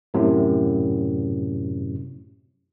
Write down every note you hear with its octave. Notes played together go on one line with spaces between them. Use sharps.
F#2 A2 C3